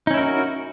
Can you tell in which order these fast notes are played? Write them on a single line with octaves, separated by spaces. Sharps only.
D#4 C#4 E4 A#4 F#4